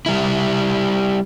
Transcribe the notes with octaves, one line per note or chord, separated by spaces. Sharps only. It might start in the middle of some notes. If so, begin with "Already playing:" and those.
G3 E4